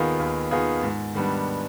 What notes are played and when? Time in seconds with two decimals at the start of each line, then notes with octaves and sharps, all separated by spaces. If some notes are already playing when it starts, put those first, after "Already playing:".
Already playing: D#2 D#3 B3 F4 G#4
0.20 D#2
0.51 D#3 B3 F4 G#4
0.83 G#2
1.14 D#3 G3 B3 D4